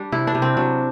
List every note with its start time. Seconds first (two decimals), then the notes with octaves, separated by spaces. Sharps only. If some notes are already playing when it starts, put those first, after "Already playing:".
Already playing: G3 D4
0.12 C3 E4
0.27 D4
0.35 C3
0.42 C4
0.57 F#3 D4